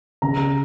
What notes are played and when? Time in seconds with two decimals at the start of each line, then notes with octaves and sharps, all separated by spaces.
0.22 C#3 A#5